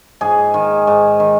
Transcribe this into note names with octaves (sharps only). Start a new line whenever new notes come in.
G#2 G#4
D#3
G#2
D#3